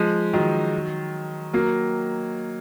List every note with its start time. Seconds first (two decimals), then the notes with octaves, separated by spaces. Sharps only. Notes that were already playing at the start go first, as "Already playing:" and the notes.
Already playing: F3 G#3
0.34 D#3 F#3
1.54 F#3 A#3